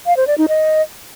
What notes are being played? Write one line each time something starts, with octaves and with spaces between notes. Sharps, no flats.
F5
C5
D5
D#4
D#5